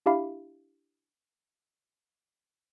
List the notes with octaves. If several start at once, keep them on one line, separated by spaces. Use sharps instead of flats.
D4 E4 G4 E5 F5 B5